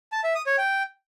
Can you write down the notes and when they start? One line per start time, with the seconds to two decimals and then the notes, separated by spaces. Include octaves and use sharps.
0.12 A5
0.24 E5
0.35 D#6
0.47 C#5
0.58 G5